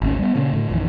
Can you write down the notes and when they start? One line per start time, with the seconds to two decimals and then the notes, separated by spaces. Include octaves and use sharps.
0.01 G#1 D2 C#4
0.19 G3 B3
0.35 A#2 C#3 A#3
0.53 A2 D3
0.70 A#1 F#2 D#3 E3